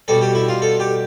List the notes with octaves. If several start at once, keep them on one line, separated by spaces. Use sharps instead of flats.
B2 G3 A4
G4
E4
F4
A4
G4